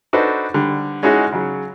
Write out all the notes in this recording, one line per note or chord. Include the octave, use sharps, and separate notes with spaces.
D4 D#4 F#4 A4 B4 C5
D3 G3
G#3 C#4 D#4 E4 F#4 G#4
C#3 F#3